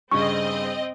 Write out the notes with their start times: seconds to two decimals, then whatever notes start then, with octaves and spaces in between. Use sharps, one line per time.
0.11 G2 C#3 C4 D#5 C#6